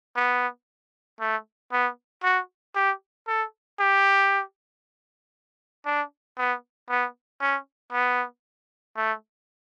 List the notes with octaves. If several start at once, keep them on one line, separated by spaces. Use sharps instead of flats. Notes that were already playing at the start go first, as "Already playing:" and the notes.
B3
A3
B3
F#4
G4
A4
G4
D4
B3
B3
C#4
B3
A3